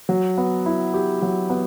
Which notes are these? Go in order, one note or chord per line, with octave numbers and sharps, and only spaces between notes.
F#3
B3
E4
G4
F#3
B3